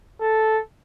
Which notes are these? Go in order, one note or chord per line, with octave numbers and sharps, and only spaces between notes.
A4